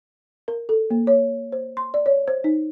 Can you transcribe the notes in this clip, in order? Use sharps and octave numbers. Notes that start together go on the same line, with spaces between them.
A#4
A4
A#3
C#5
C5
C6
D5
C#5
C5
D#4